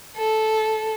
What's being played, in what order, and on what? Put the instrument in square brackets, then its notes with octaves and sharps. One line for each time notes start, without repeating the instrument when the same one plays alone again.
[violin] A4